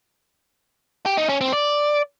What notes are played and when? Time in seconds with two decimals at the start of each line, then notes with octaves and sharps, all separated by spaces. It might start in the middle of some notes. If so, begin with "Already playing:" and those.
1.06 G4
1.18 D#4
1.29 C#4
1.41 C4
1.52 D5